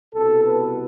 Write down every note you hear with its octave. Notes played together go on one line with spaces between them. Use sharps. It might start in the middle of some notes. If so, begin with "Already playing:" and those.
C2 B2 B3 A4
B4